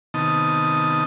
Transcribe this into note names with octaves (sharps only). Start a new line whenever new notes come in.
C3 D#3 B3 D#4 D#5 A5